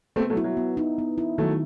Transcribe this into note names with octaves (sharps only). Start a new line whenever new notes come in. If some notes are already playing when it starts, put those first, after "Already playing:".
A3 B3 C4
F#3 A3
E4
F#3
B3
D#4
B3
E4
D#3 F#3 A3